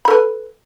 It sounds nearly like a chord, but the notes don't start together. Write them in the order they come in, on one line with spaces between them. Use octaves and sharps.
B5 A4 B4